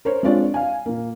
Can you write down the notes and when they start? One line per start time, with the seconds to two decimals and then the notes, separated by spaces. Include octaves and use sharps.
0.05 A#4 C5 C#5
0.23 G#3 C4 D4 F4 C#5 D5
0.54 F5 G#5
0.86 A#2 A#3